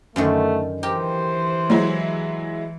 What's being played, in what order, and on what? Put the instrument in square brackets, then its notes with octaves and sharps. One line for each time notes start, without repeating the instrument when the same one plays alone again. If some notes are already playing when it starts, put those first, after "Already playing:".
[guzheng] F#2 D3 D#3 [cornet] A3
[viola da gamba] E3 [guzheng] G4 A#4 [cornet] C5
[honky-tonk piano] F#3 G#3 E4